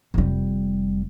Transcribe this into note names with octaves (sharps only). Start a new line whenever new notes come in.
F1 G3